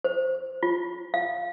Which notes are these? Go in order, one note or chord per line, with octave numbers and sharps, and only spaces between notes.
C5
F4
F5